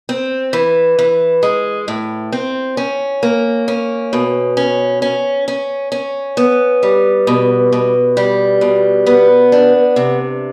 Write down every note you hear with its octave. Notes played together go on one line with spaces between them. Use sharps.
C4
E3
E3
G#3
A2
C4
C#4
A#3
C#4
B2
C#4
C#4
C#4
C#4
B3
G3
B2
B2
G3
B2
B3
D4
C3